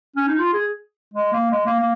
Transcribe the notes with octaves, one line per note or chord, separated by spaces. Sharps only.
C#4
D#4
F4
G#4
G#3
A#3
G#3
A#3
A#3